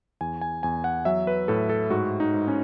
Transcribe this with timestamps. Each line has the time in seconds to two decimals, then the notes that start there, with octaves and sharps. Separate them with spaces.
0.21 E2 G#5
0.41 G#5
0.63 E2 G#5
0.84 F#5
1.05 F#3 E5
1.27 B4
1.48 A2 A4
1.69 A4
1.90 G#2 F#4
2.20 D#4
2.34 G#2
2.48 C#4